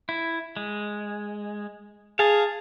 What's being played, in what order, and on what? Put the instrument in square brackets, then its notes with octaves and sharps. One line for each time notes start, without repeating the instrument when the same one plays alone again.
[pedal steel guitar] E4
G#3
[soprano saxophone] G#4 [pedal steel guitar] F5 A5